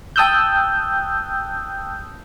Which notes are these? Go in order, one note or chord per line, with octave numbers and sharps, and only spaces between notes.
G5 A5 D#6 E6 F#6 G6